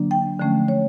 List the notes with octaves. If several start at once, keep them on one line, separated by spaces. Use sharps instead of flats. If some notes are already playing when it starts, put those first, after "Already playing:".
Already playing: D3 F#3 A#3 D4
G5
D3 F3 A3 C#4
C#5